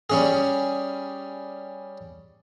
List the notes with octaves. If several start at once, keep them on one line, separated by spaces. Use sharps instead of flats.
G3 C#4 G#4